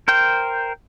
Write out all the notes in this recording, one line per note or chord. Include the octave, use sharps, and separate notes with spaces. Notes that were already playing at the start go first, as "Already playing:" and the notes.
A#4 C5 G5